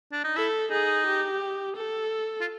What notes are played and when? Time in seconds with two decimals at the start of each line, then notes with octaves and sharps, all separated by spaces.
0.12 D4
0.24 D#4
0.36 E4 A4
0.71 D#4 G#4
1.06 G4
1.76 A4
2.41 F4